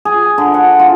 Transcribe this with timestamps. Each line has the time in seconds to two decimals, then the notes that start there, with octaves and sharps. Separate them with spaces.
0.05 G#4
0.38 D3
0.54 F#5
0.80 F4